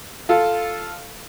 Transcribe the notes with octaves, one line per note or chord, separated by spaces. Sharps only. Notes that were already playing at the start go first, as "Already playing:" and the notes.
F4 A4